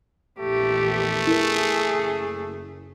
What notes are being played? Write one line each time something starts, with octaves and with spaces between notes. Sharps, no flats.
A#1 E2 E3 A3 G4
E4 G#4 A#4
F#1